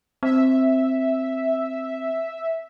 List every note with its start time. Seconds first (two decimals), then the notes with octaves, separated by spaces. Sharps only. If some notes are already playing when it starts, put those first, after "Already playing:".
0.23 C4 E5